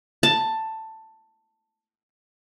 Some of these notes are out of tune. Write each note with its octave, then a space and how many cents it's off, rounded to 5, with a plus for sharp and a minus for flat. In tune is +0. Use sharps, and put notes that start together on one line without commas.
A5 +10